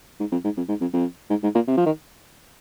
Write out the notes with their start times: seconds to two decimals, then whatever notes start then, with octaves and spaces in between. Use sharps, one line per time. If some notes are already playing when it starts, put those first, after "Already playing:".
0.20 G#2
0.32 F2
0.44 G#2
0.57 F2
0.69 G#2
0.81 F2
0.94 F2
1.30 G#2
1.43 G#2
1.55 A#2
1.68 C3
1.77 F3
1.86 D#3